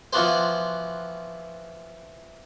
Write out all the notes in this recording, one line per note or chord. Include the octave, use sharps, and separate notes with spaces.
E3 F3 B3 F#4 G4 C5